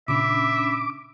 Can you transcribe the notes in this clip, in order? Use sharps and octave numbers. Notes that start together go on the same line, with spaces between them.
A#2 C#3 C#4 D4 E5 B5 D6